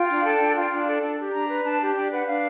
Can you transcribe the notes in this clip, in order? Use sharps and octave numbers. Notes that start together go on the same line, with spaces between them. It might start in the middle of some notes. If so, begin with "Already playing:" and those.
Already playing: F4 G5
D4
A4
D4
F4
D4
A4
D4
G4
D4 A#5
B4
D4 A5
G4
D4 G5
B4 F#5
D4 F5